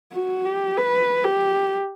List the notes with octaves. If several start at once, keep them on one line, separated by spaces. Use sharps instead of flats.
F#4
G4
B4
G4